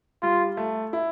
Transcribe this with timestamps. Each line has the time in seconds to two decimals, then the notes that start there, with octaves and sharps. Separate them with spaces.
0.22 G3 F4
0.57 A3
0.93 E4